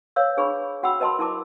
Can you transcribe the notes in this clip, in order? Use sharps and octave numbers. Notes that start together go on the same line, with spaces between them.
B4 C#5 F5 E6
D4 G#4 B4 C#5 B5 C#6
F#4 F#5 G5 B5 E6
A#4 B4 D#5 A5 B5 C6
E4 A#4 A5 D6